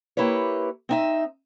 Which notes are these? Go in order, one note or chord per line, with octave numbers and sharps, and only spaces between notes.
A#3 E4 G4 B4 C#5
C4 D#4 E5